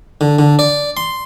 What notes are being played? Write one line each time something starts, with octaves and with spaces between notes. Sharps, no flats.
D3
D3
D5
C6